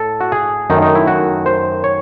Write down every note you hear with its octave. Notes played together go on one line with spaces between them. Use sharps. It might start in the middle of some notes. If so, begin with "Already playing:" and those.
Already playing: A2 A4
F#4
G#4
F#2 D#3 A3 D#4
D#4
E4
F#4
C5
C#5